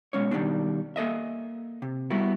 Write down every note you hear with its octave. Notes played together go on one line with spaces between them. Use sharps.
B2 G#3 C#4 C#5
B2 D#3 G3 G#3 C4 D4
A#3 A4 D#5 E5
C3
G3 A3 B3 E4 F#4